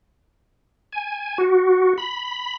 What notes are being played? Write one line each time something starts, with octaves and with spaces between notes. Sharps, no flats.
G#5
F#4
B5